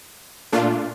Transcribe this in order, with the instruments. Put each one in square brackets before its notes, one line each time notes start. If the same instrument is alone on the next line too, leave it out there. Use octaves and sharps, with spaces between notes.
[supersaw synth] A#2 A3 D4 F4